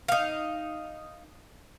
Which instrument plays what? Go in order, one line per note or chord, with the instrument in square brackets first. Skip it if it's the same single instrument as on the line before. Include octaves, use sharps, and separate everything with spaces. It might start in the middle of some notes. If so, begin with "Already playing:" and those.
[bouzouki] D#4 F5